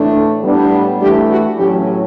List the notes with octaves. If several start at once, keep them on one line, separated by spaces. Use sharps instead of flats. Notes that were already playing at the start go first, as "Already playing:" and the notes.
Already playing: A2 E3 A3 D4
A2 G3 B3 D4
E3 A3 D4 G4
F#4
A2 F#3 C#4 G4